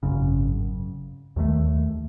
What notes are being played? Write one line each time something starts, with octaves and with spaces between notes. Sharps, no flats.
G#1 F#2 C#3
D#2 D#3 F#3 A3